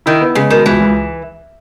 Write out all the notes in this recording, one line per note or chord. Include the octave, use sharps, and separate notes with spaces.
D#3 E4
B3
C#3 G#3
B2 D#3
C#2 E3
C#2